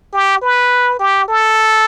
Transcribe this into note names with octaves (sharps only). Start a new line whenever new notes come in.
G4
B4
G4
A4